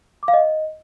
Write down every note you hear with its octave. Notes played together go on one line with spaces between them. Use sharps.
D6
F5
D#5